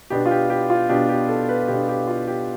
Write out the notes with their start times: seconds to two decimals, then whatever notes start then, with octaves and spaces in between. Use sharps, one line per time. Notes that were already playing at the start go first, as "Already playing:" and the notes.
0.10 B2 B3 D4 G4
0.26 F4
0.31 G4
0.50 G4
0.70 F4
0.89 B2 B3 D4 G4
1.09 G4
1.28 A4
1.49 B4
1.68 B2 B3 D4 G4
1.88 G4
2.08 F4
2.27 G4